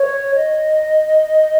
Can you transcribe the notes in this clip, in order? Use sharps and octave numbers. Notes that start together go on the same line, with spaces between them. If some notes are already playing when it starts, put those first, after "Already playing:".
Already playing: C#5
D#5